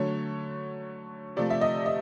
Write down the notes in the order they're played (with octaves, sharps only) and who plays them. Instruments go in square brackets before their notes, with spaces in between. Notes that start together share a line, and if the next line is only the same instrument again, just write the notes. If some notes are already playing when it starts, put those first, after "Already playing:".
Already playing: [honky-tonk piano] D3 F#3 A3 C#5
C3 F3 A3 D5
E5
D#5
D#5